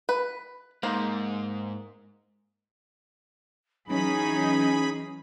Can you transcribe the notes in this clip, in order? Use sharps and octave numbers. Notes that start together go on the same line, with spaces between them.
B4
G#2 A#3 D#4 C5
E3 F#3 C#4 D#4 G#4 B5